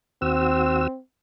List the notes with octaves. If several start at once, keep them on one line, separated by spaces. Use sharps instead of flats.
D#2 C4 F#4 E6